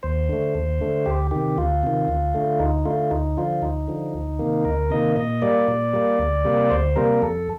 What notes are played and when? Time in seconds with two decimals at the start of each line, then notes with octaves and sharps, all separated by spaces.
0.03 D#2 C5
0.29 D3 A3
0.55 D#2
0.81 D3 A3
1.06 D2 G4
1.31 C3 D#3 G4
1.58 D2 F4
1.83 C3 D#3
2.08 D2
2.34 D3 A3
2.59 D2 D#4
2.85 D3 A3 F4
3.11 D2 D#4
3.37 D3 F3 F4
3.62 D2 D#4
3.88 D3 F3
4.14 D2
4.39 C3 D#3 A#3
4.65 D2 A#4
4.90 C3 D#3 A#3 D#5
5.16 A#2 D#5
5.42 G3 A#3 D5
5.68 A#2
5.93 G3 A#3
6.19 D2
6.45 C3 G3 A#3
6.70 D2 C5
6.96 C3 G3 A#3 A#4
7.22 F2 A4